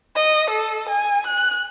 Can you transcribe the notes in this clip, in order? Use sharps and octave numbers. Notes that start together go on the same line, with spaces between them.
D#5
A4
G#5
F#6